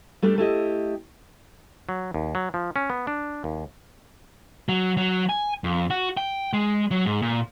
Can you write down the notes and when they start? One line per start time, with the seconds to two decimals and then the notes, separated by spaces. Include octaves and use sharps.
0.22 G3 A3 D4 G4
0.38 A3 E4 G4 D#5
1.89 F#3
2.14 D#2
2.35 F#3
2.54 F3
2.76 C#4
2.90 B3
3.07 D4
3.44 D#2
4.69 F#3
4.97 F#3
5.29 G#5
5.64 F2
5.90 F#4
6.17 G5
6.53 G#3
6.91 F#3
7.06 G#2
7.22 A#2